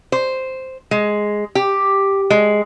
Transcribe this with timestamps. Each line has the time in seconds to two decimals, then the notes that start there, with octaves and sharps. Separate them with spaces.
0.12 C5
0.91 G#3
1.55 G4
2.30 G#3